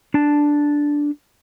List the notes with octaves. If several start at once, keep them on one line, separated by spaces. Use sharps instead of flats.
D4 A5